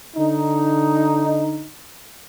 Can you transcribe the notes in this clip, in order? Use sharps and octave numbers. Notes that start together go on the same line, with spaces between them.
D3 D#4